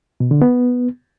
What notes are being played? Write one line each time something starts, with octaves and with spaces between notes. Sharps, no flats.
B2
D3
B3